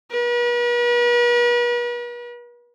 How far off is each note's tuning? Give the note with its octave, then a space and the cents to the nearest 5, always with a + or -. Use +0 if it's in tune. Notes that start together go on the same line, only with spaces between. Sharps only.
B4 -45